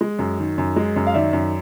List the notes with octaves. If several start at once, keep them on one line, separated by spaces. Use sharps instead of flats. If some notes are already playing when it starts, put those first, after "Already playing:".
G#3
F#2
D#3
F#2
G#3
F#2
F5
D#3 D5 E5
F#2